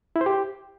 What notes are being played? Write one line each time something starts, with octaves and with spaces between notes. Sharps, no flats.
E4
C5
G4